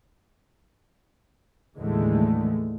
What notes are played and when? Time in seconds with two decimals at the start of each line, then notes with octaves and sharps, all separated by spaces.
1.76 D#2 A2 D3 E3 G#3 A3